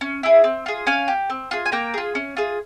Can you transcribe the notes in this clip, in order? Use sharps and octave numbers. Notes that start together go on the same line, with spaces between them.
C#4
E4 G#4
C4
F4 G#4
C#4 F5 G#5
G4
C4
F4 G#4
G#5
A#3 G5 A#5
F4 G#4
C#4
F4 G#4